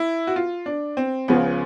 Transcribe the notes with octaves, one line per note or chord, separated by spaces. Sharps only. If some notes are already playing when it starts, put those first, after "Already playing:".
Already playing: E4
F#4
F4
D4
C4
C#2 C#3 F3 B3